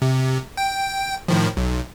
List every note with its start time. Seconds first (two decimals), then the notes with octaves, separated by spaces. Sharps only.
0.02 C3
0.57 G5
1.28 A2 D#3 F3
1.57 B1